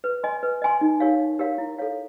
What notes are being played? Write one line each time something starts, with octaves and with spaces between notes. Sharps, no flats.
B4
D#5 G#5 C6
B4
D#5 G#5 C6
D#4
G4 A#4 C#5 F5
D#4
G4 A#4 C#5 F5
E4
A4 C#5 F5